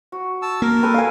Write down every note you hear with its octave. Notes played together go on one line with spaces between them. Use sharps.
F#4
A5 E6
A#3 A#4
A4 B4
F5 G#5